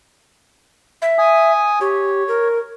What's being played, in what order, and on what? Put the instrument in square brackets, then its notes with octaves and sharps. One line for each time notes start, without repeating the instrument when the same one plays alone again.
[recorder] E5
[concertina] G#5 D#6
[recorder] G4 [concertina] C#5
[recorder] A#4